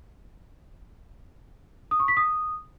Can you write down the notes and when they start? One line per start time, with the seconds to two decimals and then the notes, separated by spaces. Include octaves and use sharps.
1.91 D#6
2.00 C#6
2.08 B6
2.17 D#6